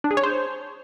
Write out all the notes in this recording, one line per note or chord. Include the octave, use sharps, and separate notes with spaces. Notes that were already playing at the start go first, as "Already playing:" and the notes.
D4
G#4
C#5
C5